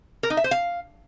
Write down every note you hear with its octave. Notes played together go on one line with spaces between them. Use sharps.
A#4
D#4
E5
C5
F5